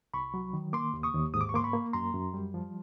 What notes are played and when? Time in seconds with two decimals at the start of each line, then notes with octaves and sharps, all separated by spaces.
0.14 C2 B5 C#6
0.34 F#3
0.53 D#3
0.73 A#3 C6 D6
0.93 D#2
1.03 C#6 D#6
1.14 D#2
1.34 G#2 D#6
1.41 D6
1.49 C#6
1.54 A#3 C6 D6
1.64 B5 C#6
1.73 A#3
1.93 F#2 A#5 C6
2.14 F#2
2.34 G3
2.54 F3